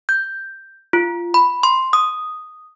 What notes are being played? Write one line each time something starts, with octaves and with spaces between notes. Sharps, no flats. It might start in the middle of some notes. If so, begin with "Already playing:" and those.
G6
F4
B5
C6
D#6